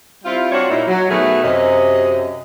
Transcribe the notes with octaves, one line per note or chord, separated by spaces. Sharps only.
G3 C4 E4 F4
C4 D4 F4 F#4 C#5 D5
A#2 A#3 D#4 E4
F#3
B2 D#3 A3 B3 F#4 G#4
F#2 C3 D#5